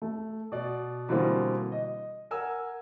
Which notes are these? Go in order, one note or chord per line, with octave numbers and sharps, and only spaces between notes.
A3
B2 D5
B2 D3 E3 G3 A#3 C4
D#5
A#4 F#5 G#5 E6